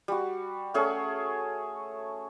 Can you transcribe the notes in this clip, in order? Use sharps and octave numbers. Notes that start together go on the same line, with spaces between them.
G3 F#4
A3 C#4 G#4 C#5